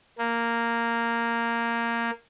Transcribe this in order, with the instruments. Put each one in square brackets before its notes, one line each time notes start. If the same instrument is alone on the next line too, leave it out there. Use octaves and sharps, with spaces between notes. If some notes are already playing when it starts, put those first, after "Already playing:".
[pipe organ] A#3